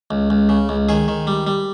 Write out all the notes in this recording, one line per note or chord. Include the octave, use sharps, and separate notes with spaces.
C#2
C#2
C#3
C#2
D#3 G#4
D#3
G3
G3